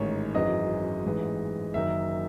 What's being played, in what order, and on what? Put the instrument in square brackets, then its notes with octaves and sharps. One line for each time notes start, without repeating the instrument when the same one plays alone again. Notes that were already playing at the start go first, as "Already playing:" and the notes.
Already playing: [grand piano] A1 G#2 D#3 C#5
G#1 F#2 E3 G#3 D#5
A1 G#2 E3 G#3
F#1 F#2 D#3 F#3 E5